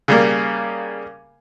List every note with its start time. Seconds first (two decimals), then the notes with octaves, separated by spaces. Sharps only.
0.08 C#3 G3 A#3